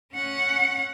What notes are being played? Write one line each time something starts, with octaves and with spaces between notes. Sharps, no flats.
C#4 F#5